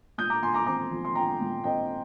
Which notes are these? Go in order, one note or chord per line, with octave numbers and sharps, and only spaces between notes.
A#2 D#6 G6
A#5 D6
A#2 G#5 C6
A#5 D6
C4 A#5 D6
F3
C6
A#2 G5 A#5
A#2
C4 D#5 G5